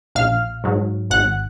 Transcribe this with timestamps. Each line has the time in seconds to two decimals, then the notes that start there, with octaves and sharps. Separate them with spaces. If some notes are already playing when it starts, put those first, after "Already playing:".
0.15 A#1 F5 F6
0.64 G#2 F#3
1.11 G#1 F#5 F#6